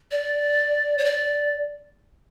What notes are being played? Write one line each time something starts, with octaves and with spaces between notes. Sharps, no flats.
D5
C#5
D5